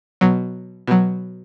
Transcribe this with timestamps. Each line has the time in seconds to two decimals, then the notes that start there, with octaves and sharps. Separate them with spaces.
0.21 B2 F#3
0.87 B2 F#3